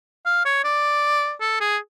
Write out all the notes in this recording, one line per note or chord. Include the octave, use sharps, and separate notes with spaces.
F5
C#5
D5
A4
G#4